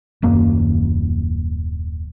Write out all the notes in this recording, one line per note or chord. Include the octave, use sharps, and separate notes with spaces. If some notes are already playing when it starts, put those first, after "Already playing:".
D#1 F#2 A#3